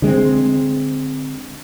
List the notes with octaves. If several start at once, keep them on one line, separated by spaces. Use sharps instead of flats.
D3 G#3 B3 C4